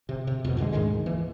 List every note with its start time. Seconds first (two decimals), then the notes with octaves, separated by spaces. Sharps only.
0.09 C3
0.27 C3
0.44 F2 B2
0.57 F2 B2 D3 G#3
0.72 D2 G#2 D#3 G#3
1.06 E3 A#3